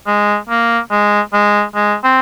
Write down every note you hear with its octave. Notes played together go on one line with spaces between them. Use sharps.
G#3
A#3
G#3
G#3
G#3
C4